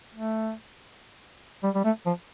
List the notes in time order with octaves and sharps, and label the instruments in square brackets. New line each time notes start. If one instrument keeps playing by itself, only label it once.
[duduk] A3
G3
G3
A3
F3